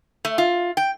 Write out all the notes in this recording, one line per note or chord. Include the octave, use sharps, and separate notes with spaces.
A3
F4
G5